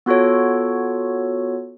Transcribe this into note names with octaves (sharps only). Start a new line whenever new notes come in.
B3 F4 F#4 A4 C#5